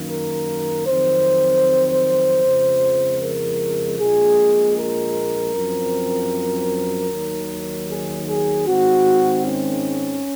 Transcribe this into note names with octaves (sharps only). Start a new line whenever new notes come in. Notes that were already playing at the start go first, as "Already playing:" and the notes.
Already playing: F#2 D#3 A#3
A#4
F2 D#3 F#3 C4 C5
F2 C#3 F3 G#3
A#4
A#1 A#2 G#3 G#4
A#4
F#2 F3 C4
D#2 D#3 F#3
G#4
G#4
G#2 D#3 G#3 C4 F#4
C#4